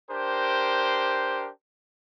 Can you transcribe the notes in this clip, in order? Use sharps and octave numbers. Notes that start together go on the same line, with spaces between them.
D4 G4 A#4 C5